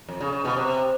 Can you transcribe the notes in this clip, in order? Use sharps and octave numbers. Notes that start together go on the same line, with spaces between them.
F2
C#3
C#3
B2
C3